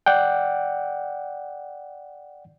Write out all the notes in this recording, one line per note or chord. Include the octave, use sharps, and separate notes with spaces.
D5 F#5 G5